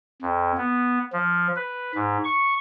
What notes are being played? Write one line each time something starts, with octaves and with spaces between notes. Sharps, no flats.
F2
B3
F3
B4
G#2
C#6